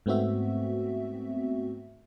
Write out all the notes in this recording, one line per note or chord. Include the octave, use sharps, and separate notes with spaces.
G#2 A3 B3 C4 F#4 E5